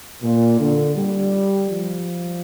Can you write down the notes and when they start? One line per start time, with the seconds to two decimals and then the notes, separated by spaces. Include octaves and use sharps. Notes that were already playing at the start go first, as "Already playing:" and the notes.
0.22 A#2
0.59 D3
0.96 G3
1.69 F3